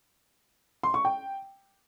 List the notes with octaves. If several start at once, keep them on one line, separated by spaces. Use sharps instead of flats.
C6
C#6
G5